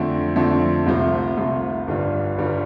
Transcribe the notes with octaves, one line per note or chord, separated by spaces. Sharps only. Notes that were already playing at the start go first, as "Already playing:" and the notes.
Already playing: F2 D3 F3 A3 C4
F2 D3 F3 A3 C4
C2 C3 A3 F4 C5
C2 C3 A3 F4 C5
G1 G2 G3 D4 F4
G1 G2 G3 D4 F4